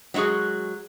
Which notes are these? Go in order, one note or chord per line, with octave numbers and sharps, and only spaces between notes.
F#3 G#3 F4 F#4 G#4